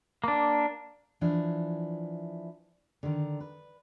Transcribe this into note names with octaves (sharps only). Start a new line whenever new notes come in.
A#3 D4
E3 F3 D4 E4
D3 D#3
B4